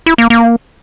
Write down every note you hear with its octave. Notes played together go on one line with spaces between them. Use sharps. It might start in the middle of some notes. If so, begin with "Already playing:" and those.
E4
A#3
A#3